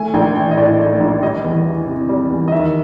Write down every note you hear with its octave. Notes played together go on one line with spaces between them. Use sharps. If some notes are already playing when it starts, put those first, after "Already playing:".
Already playing: A3 G#5
A#1 G5
E3 G5
D#5
A2 D5
A3
A#1
G3 D#5
E2
E3
C3
G3
E2
D#5
D#2 E5